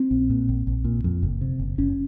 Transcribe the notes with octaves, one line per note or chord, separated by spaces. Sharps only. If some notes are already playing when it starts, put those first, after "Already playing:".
Already playing: C4
A#1
A#2
A#1
A#1
A#2
F2
F#1
C3
F#1
F#1 C#4